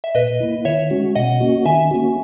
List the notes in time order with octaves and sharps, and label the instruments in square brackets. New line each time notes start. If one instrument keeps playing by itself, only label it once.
[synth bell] E5
[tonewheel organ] A#2 [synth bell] B4 D#5
[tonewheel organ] A#3 E4
[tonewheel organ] D#3 [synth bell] C#5 E5
[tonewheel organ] G#3 C#4 F#4
[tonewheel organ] B2 [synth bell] D#5 F#5
[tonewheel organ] A#3 C#4 F#4
[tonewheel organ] D#3 [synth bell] E5 G#5
[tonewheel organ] A#3 C#4 F#4